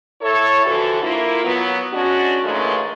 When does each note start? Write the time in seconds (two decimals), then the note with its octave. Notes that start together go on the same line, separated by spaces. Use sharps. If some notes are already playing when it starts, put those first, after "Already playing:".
0.22 E4 A4 C#5
0.66 G2 D3 E3 F3 F#4 A4
1.02 A#3 E4 F4
1.44 F#3 B3
1.93 G#3 C#4 D4 F#4
2.44 G2 A#2 E3 F#3 G#3 A3